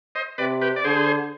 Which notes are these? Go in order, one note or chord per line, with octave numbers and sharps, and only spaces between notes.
C5 D#5
C3 B4 D5
G4 B4
D5
D3 G#4 C5